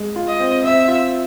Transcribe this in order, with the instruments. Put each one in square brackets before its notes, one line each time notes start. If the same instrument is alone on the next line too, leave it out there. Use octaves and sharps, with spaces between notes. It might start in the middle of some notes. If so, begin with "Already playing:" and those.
Already playing: [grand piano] G#3
F4
[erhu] D#5
[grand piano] C4
[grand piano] C4 [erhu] E5
[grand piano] F4